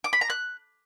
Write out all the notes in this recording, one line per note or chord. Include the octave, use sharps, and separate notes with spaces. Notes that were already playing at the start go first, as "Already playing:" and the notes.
D6
B5
A#5
F#6